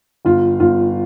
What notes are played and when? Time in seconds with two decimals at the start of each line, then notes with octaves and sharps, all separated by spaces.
0.25 G1 F4
0.60 G1 F4